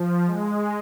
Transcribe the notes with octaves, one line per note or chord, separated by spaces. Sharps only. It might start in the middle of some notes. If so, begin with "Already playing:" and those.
Already playing: F3
G#3